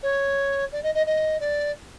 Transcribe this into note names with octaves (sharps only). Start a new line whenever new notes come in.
C#5
D5
D#5
D#5
D#5
D5